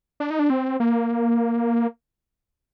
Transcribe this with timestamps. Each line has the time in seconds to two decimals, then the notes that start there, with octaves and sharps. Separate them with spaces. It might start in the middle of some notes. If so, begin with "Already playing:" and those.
0.20 D4
0.30 D#4
0.39 D4
0.50 C4
0.80 A#3